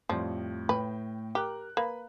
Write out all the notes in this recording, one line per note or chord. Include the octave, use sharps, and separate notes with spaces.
F2 A2 F3 G3
A2 B4 G5
G4 A#4 F#6
A#3 B4 B5